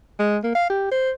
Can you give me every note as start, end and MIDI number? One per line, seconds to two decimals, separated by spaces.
0.19 0.38 56
0.43 0.50 58
0.55 0.65 77
0.69 0.87 67
0.91 1.11 72